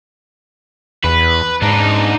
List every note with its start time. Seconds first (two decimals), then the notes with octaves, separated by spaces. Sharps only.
1.04 E2 B4
1.62 G#2 D4 D#4